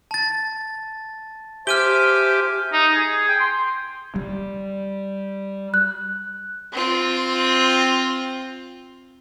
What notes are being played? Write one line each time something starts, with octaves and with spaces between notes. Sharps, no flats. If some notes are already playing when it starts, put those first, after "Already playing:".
A5 A6
G4 C5 E5 G#5 D6 F6 D#7 G7
D#4
G#4
G5
C6
G3
F#6
C4 F4